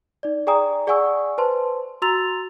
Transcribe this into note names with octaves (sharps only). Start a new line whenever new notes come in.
D#4 D5
G#4 D5 G5 G#5 A#5 D#6
G#4 D5 F#5 G#5 C#6 E6
B4 C5 A5 C6
F#4 A#5 C6 E6 A6 F7